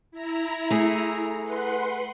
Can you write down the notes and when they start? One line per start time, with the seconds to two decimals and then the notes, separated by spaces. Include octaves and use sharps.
0.11 E4 A#5
0.70 A3 G#4
1.40 B4 F#5 C6